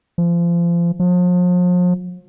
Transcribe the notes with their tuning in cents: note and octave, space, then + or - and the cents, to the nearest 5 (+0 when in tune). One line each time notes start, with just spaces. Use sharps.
F3 -30
F3 +40